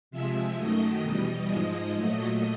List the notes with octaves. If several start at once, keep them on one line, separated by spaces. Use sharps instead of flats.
C3 F3 G#3 E5
F#2 D#3 F#3 A3 D#5
E2 B2 G3
G#2 F3 G#3
A#2 F#3 A3